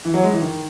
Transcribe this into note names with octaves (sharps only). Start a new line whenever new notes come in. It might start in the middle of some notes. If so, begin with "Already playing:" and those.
E3
F#3
G#3
E3
D#3